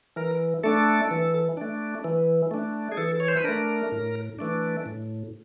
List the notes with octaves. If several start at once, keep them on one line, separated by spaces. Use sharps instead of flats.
E3 A#4
A3 D4 A4
E3
A3 D4
E3
A3 D4
G#4
E3 A4
C#5
C5
B4
A3 D4 A#4
A2
E3 A3 D4
A2